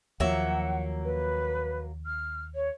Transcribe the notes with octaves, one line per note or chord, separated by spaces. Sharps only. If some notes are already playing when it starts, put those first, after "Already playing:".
D#2 F3 F#3 A#3 E5 F#5
B4
F6
C#5